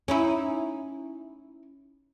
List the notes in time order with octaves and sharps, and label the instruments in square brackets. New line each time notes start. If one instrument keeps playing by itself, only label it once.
[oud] C#4 D#4 E4